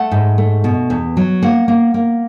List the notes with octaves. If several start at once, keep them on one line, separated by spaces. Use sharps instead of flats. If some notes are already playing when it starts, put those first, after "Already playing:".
Already playing: A3 F#5
G#2
A3
B2
E2
F#3
A#3 F#5
A#3
A#3